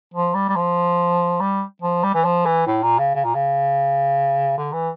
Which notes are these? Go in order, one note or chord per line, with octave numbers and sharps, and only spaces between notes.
F3
G3
G3
F3
G3
F3
G3
E3
F3
E3
A2
A#2
C#3
C#3
A#2
C#3
D3
E3